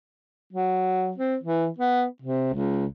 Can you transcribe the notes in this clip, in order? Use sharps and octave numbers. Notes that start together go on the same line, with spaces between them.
F#3
C4
E3
B3
C3
C#2